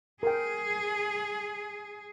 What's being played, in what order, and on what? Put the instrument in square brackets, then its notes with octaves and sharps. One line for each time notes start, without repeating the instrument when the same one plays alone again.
[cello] G#4 [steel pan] A#4 G5